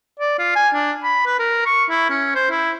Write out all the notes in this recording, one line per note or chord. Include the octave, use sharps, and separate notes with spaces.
D5
F4
G#5
D4
B5
B4
A#4
C#6
E4
C#4
C5
E4